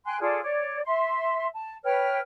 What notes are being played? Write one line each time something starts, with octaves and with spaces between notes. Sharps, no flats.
G5 G#5 C6 F#6
F4 G#4 A4 D5
C#5 D5
E5 C6
A5
B4 C#5 G5 F6